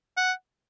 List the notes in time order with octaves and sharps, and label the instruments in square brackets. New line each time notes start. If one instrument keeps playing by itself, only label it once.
[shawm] F#5